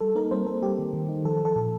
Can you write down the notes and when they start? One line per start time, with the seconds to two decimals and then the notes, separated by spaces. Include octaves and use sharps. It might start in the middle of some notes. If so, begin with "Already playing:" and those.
0.01 G3 A4
0.16 A#3 D#4 A#4
0.31 G3 C4 C5
0.47 A#3 A4
0.63 G3 G4
0.79 D#3
0.93 D#3
1.09 D#4
1.25 F3 A4
1.40 F3
1.45 A4
1.56 A#2